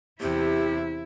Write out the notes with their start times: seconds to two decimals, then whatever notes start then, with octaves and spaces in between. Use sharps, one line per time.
0.20 E2 C3 E4 G4